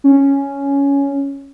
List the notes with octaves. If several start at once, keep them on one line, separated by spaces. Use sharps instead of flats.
C#4